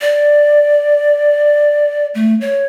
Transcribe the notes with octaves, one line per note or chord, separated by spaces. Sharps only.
D5
A3
C#5